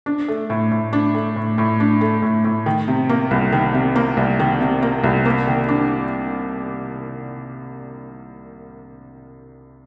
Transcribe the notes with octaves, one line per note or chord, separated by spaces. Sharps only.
D4
A3
A2
A2
D4
A3
A2
A2
D4
A3
A2
A2
D#3
C3
A#3
C2
D#3
C3
A#3
C2
D#3
C3
A#3
C2
A#3
D#3
D4